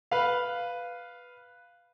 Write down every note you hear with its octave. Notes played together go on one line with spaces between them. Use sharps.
B4 F5